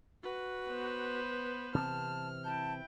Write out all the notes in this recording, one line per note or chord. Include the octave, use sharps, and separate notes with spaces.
F#4 B4
B3 C5
C3 E3 C4 A5 F6
E4 G5 A5